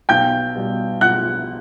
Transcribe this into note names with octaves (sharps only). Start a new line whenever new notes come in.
B1 G5 G6
B2 G3
B1 F#5 F#6